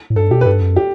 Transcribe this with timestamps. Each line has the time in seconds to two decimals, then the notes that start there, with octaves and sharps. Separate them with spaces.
0.10 A2
0.16 G2 A4
0.31 B2 G4
0.41 B4
0.46 G2 A4
0.62 F#2
0.76 G4